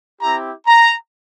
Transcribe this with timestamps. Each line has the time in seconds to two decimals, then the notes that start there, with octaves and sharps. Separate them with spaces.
0.20 C4 E4 G4 A#5
0.66 A#5